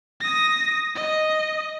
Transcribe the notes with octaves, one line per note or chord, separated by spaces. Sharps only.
D#6 A#6
D#5